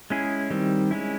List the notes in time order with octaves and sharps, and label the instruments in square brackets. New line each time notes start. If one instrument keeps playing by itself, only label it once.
[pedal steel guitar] G#3 C#4 E4 G#4
D#3 G3 C4
G#3 C#4 E4